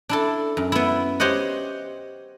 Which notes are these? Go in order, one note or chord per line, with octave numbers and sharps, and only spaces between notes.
D4 E4 A4
F#2
B3 E4
G4 C5 C#5 D#5 F#5